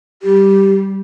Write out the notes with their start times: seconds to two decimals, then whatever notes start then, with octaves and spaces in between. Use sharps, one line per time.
0.23 G3 G4